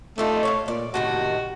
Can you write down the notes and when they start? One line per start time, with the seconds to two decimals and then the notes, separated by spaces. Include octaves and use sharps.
0.18 A3 D4 D#4 F4
0.43 C#5 E5 F5
0.68 A#2 D5
0.94 A2 C3 D#3 F#4